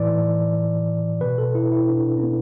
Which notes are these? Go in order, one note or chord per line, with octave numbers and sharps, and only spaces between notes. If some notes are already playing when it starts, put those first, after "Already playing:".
Already playing: A2 E3 D5
B2 B4
A4
E4
E4
D4
C#4
B3